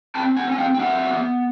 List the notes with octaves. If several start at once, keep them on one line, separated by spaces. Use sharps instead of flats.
C4 G5 A5
F#5 G#5
C4 G#5
F5 G5
G5
F#3 E5 F#5
B3